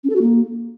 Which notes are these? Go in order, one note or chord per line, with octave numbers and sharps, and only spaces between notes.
C#4
A4
F#4
A#3